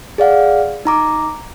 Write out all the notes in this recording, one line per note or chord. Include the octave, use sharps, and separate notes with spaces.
G#4 D5 F5 F#5
D#4 A#5 D6